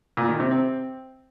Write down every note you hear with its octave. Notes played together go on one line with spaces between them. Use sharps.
A#2
D#3
C3
C4